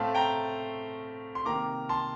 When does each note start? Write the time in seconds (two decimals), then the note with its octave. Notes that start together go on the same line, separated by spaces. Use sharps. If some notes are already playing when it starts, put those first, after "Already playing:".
Already playing: A2 A3 C4 F5 A5
0.15 G5 A#5
1.35 C6
1.45 C3 D#3 A#3 A#5 D6
1.89 A5 C6